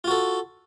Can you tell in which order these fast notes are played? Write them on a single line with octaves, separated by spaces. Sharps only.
F4 F#4 A4